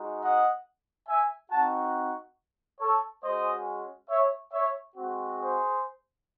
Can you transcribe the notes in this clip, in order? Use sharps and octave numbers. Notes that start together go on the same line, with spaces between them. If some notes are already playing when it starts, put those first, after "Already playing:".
Already playing: G#3 D#4 F#4
D#5 F#5
E5 G#5
C4 D#4 F#4 F#5 A5
A4 C#5
G#3 C#4 F#4 C5 D#5
C#5 E5
C#5 E5
G#3 C4 F#4
G#4 C5